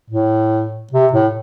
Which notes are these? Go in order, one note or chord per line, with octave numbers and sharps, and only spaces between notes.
A2
C3
A2